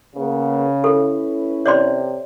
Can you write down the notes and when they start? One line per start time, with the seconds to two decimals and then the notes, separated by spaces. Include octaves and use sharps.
0.15 C#3 A#3 B3 G#4
0.84 C#4 E4 A4 B4
1.66 C3 C#5 D5 C6